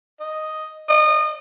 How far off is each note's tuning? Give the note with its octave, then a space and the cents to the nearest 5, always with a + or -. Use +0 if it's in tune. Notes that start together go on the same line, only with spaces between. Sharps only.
D#5 +0
D#5 -30